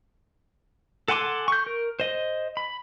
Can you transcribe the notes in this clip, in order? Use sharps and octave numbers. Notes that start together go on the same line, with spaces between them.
A4 F#5 G#5 C6 D6
C#6 G6
A#4
C5 D#5
B5